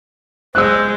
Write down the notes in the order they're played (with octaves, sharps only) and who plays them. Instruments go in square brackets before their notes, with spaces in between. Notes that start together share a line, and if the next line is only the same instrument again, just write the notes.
[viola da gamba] G#3 [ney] C5 [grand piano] E6 F#6